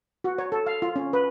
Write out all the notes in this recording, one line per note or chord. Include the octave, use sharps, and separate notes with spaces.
F#4
C#5
A4
F5
F4
C#4
B4